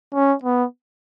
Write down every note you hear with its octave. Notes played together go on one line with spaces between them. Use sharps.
C#4
B3